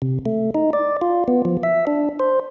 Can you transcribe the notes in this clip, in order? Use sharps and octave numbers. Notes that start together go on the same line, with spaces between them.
C3
A3
D#4
D5
F4
B3
F3
E5
D4
C5